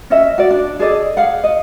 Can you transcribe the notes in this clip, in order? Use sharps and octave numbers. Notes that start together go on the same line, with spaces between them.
C#4 D#5 E5
F#4 D5
D4
G#4 A4 D5 D#5
G#4 F5 F#5
D#5